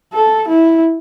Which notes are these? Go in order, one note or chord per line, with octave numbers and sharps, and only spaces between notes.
A4
E4